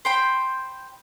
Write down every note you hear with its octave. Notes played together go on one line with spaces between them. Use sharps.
C5 G5 B5